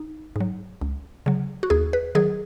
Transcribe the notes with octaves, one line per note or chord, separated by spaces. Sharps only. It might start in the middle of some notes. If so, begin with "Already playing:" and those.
Already playing: D#4
G#2 F#3
C#2
C#3 F#3
F#4
D#2 G#4
B4
D#3 F#3 G#4